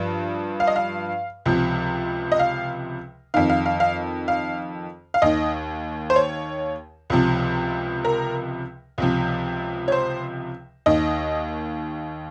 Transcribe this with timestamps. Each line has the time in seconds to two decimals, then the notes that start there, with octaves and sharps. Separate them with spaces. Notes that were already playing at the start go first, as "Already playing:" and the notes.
Already playing: G2 F3
0.60 F5
0.67 D#5
0.76 F5
1.45 C#2 C3 F3
2.32 D#5
2.39 F5
3.34 F2 D#3 F5
3.50 F5
3.66 F5
3.80 F5
4.28 F5
5.14 F5
5.22 D#2 D#3 D#5
6.10 C5
6.16 C#5
7.10 C#2 C3 F3
8.05 A#4
8.98 C#2 C3 F3
9.88 C#5
9.92 C5
10.86 D#2 D#3 D#5